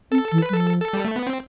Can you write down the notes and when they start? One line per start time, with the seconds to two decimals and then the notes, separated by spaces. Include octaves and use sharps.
0.11 C4 A4
0.32 E3
0.42 B4
0.50 G3
0.53 F3 A4
0.82 A4
0.93 G3
1.05 A3
1.16 B3
1.27 C4